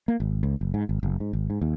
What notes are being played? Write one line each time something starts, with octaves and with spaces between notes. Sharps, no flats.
A#3
G#1
C#2
F#1
G#2
G#1
F#1
G#2
G#1
G#2
D#2